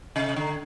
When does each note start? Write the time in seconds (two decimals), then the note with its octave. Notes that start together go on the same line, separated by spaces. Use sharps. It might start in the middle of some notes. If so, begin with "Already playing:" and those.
0.16 C3
0.36 D3